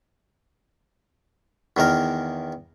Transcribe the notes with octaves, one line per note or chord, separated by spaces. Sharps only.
E2 D#3 A#4